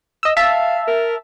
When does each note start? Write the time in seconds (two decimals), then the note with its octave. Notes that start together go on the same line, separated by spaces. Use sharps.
0.23 D#5 E6
0.37 E5 F5 A5
0.88 A#4